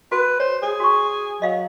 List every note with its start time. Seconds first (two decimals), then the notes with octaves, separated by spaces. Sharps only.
0.12 F#4 B4
0.40 C5 C#5
0.63 G#4
0.80 F#4 C#6
1.42 F#3 D#5 F5